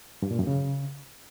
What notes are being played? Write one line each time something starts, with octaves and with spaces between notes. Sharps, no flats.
G2
A#2
F#2
C#3